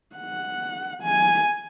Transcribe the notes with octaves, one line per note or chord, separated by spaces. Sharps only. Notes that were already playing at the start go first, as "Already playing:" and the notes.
F#5
G#5